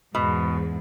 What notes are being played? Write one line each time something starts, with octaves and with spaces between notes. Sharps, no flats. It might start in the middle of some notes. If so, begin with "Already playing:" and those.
E2 G#2 B2